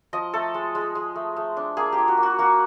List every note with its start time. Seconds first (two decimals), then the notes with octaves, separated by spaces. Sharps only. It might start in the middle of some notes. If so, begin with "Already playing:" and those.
0.13 F3 D#5
0.33 A3 A4
0.54 G#3
0.75 G#3
0.95 G#3
1.15 A3
1.37 A3
1.57 D4
1.77 A#3 G#4
1.93 G4
1.98 F4
2.08 F#4
2.17 A#3
2.23 F#4
2.38 A#3 F#4